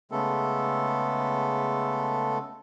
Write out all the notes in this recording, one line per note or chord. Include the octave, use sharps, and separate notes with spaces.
C#3 G#3 A3 B3 A4